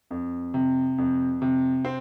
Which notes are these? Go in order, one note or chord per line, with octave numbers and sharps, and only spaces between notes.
F2
C3
F2
C3
C4